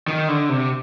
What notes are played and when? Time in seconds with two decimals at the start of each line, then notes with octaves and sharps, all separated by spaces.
0.08 D#3
0.28 D3
0.49 C3